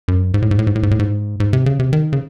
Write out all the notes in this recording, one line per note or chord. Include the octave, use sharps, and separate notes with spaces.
F#2
G#2
A2
G#2
A2
G#2
A2
G#2
A2
G#2
G#2
C3
C#3
C3
D#3
C#3